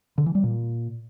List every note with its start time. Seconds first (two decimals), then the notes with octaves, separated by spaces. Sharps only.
0.18 D3
0.26 E3
0.35 G3
0.43 A#2